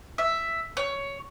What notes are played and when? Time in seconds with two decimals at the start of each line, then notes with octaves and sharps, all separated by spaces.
0.18 E5
0.77 C#5